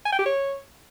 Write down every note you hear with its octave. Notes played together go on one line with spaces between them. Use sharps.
G#5
G5
G4
C#5